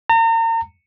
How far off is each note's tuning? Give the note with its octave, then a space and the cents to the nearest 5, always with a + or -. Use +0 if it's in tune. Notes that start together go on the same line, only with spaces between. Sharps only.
A#5 -40